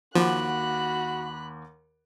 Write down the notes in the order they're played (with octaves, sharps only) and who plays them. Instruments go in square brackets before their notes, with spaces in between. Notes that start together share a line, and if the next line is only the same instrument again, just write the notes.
[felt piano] D#2 F#5 D6 [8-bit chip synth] F3 [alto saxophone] F#4 [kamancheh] B5 F#6